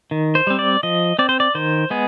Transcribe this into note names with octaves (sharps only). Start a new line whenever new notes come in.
D#3
C5
G3 C4
D5
F3 D#5
C4 D5
C5
D5
D#3 C5
G#3 B3 G#4